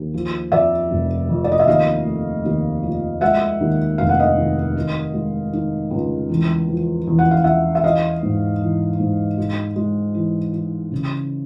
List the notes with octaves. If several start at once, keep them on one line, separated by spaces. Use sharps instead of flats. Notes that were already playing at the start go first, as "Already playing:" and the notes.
Already playing: D#2
F3
F2 D5 E5
F1
F2
D5
D#5
E5
D#2 D#5 F5
A3
D#2
F3
G#3 E5 F#5
D#2
F1 F5
F#5
D#5 F5
D#3
D#3
G#3
D#3
C#2
E2
F3
E2
F#5
F5
E2 E5 F#5
E5
E3 D#5 F5
G#2
E3
G#2
G#3
G#3
E3
E3
C#3